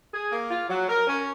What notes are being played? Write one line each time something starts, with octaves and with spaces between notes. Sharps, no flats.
G#4
A#3
F4
F#3
A#4
C#4